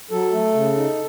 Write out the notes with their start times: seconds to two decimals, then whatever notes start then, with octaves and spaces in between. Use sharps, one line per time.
0.11 F#3 A4
0.32 A3
0.54 C#3
0.76 D#4